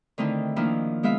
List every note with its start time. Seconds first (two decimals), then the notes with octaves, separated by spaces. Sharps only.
0.18 D3 D#3 A3 C4 D#4 E4
0.56 D#3 F3 A#3 D4 E4
1.03 G#3 B3 F4 E5 F5